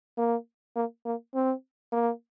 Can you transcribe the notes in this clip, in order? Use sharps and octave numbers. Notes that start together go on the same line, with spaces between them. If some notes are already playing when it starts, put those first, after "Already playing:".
A#3
A#3
A#3
C4
A#3